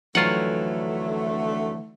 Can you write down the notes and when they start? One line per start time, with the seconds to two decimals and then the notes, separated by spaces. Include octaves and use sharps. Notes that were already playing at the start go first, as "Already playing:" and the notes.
0.15 F2 D3 E3 F#3 A3 D#4 F4 F#5